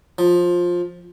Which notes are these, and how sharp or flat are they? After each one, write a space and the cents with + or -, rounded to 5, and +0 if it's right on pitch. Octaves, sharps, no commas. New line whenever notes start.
F3 +15